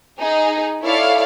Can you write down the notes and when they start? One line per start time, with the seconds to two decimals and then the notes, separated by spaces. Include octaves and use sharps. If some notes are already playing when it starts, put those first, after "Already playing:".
0.19 D#4 G#4
0.83 E4 A4 C#5 D5 F5